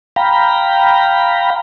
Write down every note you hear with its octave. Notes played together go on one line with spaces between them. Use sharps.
F5 G5 A#5 B5